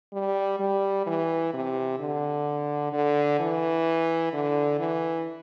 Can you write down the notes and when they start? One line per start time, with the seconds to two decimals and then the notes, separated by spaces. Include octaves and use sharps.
0.13 G3
0.59 G3
1.06 E3
1.53 C3
1.99 D3
2.93 D3
3.39 E3
4.33 D3
4.79 E3